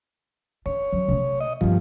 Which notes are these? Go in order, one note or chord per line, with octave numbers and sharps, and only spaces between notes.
D4 C#5
F#3 G3
C3 A3
D#5
G2 F3 B3 C4